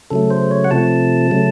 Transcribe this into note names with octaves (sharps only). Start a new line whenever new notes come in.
C#3 F#3 A3 A4
C5
C#5
F#5
C3 F3 A3 A5
C#3 F#3 A3